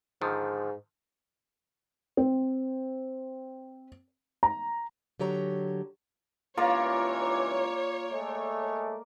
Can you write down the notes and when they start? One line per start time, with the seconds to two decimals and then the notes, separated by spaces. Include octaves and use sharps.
0.22 G#2 D3 D#3 F3
2.17 C4
4.43 A#5
5.20 D3 F#3 G4 C#5 A#5
6.58 C#2 G2 E3 A#3 F4 A#4 C#5 D5
8.12 G#3 A3